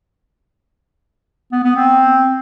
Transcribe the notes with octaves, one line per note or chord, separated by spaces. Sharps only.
B3
B3
C4